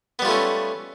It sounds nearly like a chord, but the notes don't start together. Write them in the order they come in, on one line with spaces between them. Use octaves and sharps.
B3 G3 F4 A3 C#4